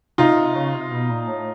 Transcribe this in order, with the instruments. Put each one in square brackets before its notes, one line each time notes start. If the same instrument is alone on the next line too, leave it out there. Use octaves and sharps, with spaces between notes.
[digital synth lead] C3 [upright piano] D#4 F4
[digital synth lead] C3
C#3
C3
B2
A#2
A2